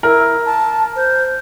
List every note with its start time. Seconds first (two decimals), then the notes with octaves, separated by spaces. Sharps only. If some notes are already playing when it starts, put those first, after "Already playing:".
0.03 E4 A#4
0.45 A5
0.96 C5